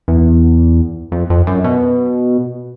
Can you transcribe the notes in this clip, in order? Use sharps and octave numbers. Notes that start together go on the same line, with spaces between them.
E2
F2
F2
F#2
B2